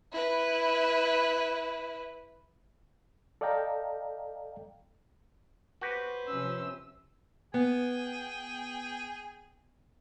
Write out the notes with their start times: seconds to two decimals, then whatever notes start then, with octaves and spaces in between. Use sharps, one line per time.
0.12 E4 B4
3.41 A4 D5 D#5 F5 G5 A#5
5.81 F#4 G4 B4 C5
6.28 C3 F3 C#4 E6
7.54 B3 G#4 G5